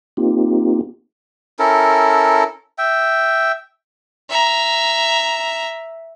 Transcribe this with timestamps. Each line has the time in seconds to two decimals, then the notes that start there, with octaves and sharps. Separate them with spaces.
0.17 A#3 C4 D#4 F4 G4
1.59 C#4 E4 A4 A#4
2.78 E5 G5
4.30 E5 A#5